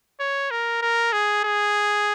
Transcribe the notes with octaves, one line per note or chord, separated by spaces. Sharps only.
C#5
A#4
A#4
G#4
G#4